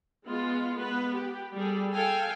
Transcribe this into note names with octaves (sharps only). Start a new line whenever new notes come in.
G#3 B3 F4
B3 B4
G4
G3 G#4 A4
A4 F5 G5 G#5